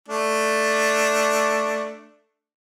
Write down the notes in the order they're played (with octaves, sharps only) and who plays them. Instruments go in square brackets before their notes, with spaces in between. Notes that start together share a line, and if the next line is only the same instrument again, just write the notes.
[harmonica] A3 D4